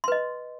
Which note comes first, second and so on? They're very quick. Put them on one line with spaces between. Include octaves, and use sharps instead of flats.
C6 B4 D#5